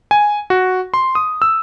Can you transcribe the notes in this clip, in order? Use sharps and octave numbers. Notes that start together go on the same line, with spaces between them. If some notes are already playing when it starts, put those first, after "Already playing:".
G#5
F#4
C6
D#6
E6